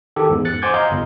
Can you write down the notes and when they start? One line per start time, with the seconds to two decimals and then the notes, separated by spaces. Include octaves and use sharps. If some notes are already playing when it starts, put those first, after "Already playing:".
0.16 D#3 G4 A4
0.29 E2 G#2
0.45 F#6 A6 C#7
0.62 C5 F#5 G#5 D6 G6 G#6
0.74 D#5 F5 A#5 C6 G6
0.91 G1